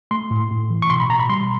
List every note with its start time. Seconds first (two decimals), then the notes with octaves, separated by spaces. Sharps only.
0.11 A3 C6
0.31 A2
0.51 A2
0.70 E3
0.82 C#6
0.90 B2 C6
1.00 B5
1.10 B2 A#5
1.20 B5
1.29 G3 C6